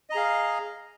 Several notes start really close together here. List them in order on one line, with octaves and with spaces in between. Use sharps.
D#5 A#5 G#4 F5